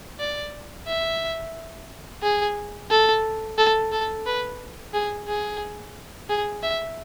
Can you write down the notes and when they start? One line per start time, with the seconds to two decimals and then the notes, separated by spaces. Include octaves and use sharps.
0.20 D5
0.87 E5
2.23 G#4
2.90 A4
3.58 A4
3.92 A4
4.26 B4
4.94 G#4
5.28 G#4
6.29 G#4
6.63 E5